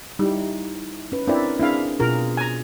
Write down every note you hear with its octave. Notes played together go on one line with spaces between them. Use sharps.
G3 D#4 E4
C#4 B4
C4 D4 E4 A#4 D5
C4 D4 E4 G#4 F5
B2 F4 G#4 A#4
G#5 A#5